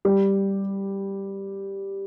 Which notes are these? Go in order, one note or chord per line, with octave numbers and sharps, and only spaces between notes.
G3 G4